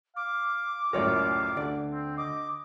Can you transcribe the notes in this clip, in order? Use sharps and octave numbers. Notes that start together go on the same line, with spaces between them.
F5 D6
C#2 F#2 A2 F4 A#4 C#5 D5
D2 D3 D5
C4
D#5 D6